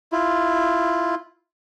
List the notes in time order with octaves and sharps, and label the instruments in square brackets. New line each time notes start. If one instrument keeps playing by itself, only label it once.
[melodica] E4 F4